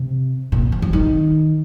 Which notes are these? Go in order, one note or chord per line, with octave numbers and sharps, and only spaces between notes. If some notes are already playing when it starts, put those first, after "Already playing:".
Already playing: C3
A#2
F3
F3
D#3